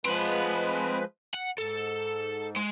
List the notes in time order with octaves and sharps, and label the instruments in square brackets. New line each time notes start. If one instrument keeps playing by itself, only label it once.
[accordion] F3 G#3 B4 [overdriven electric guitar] C4 F#5
[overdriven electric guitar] F#5
[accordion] G#2 [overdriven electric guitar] A4
[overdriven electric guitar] G#3